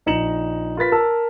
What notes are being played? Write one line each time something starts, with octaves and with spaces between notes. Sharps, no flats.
A#1 D#4 A#5 C#7 E7 F#7
F4 A#4 B4 A6 B6
A#4 A5 E6